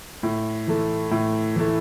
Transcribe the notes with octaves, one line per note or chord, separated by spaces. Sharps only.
A2
E3 A3
A2
E3 A3